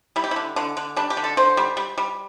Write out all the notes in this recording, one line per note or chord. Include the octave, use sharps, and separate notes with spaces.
G3 E4
G4
D3 E4
D3
D3
G3 D4
G4
D3
A4
D3 C5
G3
G3
G3